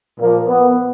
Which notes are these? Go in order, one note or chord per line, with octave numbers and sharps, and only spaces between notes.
A#2 F3 A#3
B3